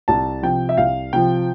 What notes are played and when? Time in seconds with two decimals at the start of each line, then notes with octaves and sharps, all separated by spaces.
0.08 C2 A5
0.43 C3 F3 G5
0.69 E5
0.77 C2 F5
1.13 C3 F3 G5